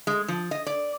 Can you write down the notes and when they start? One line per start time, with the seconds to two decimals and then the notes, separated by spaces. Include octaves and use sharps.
0.07 G#3
0.28 F3
0.51 D#5
0.67 D5